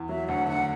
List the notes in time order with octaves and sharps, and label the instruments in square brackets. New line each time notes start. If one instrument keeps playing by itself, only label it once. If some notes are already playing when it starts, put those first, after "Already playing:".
Already playing: [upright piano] E2
[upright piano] F#3 [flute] E5
[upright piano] D2 [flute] F#5
[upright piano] D3 [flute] F#5